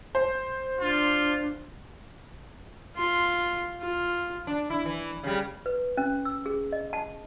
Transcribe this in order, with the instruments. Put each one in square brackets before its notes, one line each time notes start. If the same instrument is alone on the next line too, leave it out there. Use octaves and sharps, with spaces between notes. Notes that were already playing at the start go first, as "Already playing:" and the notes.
[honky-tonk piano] C5
[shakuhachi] D4 [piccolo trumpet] F4
[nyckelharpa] F4 C6
F4
[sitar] D4
E4
E3
C#3 G3
[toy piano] B4
C#4
E6
G#4
D#5
A5